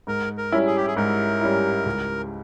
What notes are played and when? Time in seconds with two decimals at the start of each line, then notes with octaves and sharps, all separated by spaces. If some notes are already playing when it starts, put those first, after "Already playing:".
0.07 G#2 A#4
0.38 A#4
0.52 G3 C#4 E4
0.67 G#4
0.76 G4
0.87 G#4
0.97 G#2 A#4
1.41 G3 C#4 E4
1.86 C#2